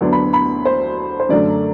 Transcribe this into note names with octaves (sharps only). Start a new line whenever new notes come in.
D2 D3 F#3 B3 D4
B5
B5
C5
C5
F#2 D3 F#3 A3 D5